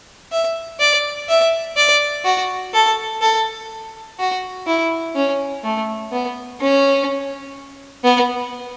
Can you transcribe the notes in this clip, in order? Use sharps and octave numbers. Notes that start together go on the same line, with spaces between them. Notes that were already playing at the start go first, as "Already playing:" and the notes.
E5
D5
E5
D5
F#4
A4
A4
F#4
E4
C#4
A3
B3
C#4
B3